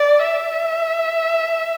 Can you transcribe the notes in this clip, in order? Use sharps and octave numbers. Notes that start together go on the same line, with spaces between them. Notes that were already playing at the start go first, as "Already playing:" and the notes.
Already playing: D5
E5